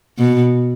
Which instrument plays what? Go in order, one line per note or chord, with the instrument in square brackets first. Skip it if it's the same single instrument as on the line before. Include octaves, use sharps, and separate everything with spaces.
[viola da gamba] B2